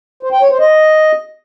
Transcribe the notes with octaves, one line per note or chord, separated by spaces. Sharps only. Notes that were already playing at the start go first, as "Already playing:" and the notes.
C5
G5
C#5
C5
D#5